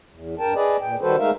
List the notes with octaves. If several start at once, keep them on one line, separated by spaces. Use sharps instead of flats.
E2
G2 A#4 G5 A5
G#4 B4 D5 D#5
A#2 G5
D#3 G3 F#4 A4 B4 C5
G#3 A3 D#4 A#4 E5 F5